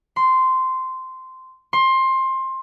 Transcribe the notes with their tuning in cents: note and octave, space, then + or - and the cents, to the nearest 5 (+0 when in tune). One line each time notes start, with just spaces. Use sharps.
C6 -10
C6 +20